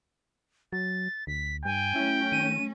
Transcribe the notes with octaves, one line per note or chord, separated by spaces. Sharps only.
F#3 A6
D2 B6
G2 G5 G#5
F#3 A3 C#4 E4
D#3 D#7